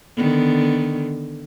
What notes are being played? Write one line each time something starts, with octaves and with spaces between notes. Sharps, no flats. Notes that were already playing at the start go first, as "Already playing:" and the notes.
D3 D#3 B3